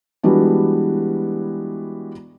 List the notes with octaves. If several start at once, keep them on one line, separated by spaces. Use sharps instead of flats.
E3 G3 G#3 B3 D4 F#4